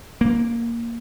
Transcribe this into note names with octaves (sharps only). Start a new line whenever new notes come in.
A#3